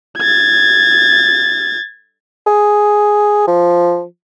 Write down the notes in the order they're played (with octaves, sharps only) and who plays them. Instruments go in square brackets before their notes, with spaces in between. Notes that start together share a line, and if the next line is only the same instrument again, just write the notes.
[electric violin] G#6 A6
[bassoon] G#4
F3